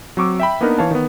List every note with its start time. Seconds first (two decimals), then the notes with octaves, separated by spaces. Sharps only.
0.17 F#3 C4 C#6 D6 E6
0.40 E5 G5 B5
0.61 A#3 B3 D4 D#4 A#4 B4
0.78 E3 C#5 F5 A5
0.91 D#3 B3